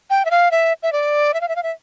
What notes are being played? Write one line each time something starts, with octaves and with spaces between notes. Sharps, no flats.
G5
E5
F5
E5
E5
D5
E5
F5
E5
F5
E5